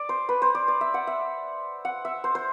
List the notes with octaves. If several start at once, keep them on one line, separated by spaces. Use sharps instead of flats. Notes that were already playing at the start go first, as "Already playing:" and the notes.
Already playing: D5
C5
B4
C5
D5
D5
E5
F#5
E5
F#5
E5
C5
C5